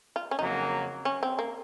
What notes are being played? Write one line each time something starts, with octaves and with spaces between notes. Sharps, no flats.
F4
C#4
F2 C#3 F#3 A#3 D#4
C#4
C4
A#3